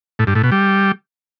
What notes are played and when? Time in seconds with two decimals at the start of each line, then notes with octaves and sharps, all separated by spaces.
0.19 A2
0.27 G2
0.35 A2
0.43 B2
0.52 G3